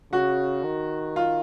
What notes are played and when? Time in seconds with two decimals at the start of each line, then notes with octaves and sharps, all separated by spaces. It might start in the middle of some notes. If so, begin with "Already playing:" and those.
0.12 C#3 F#4
0.64 D#3
1.16 F4